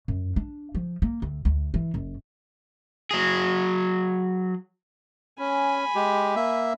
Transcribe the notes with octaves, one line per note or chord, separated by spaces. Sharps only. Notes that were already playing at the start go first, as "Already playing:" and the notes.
F#2
D4
F3
A#3
D2
D2
E3
F#1
F#3 G#4
C#4 G#5 B5
G#3 G4
A#3 E5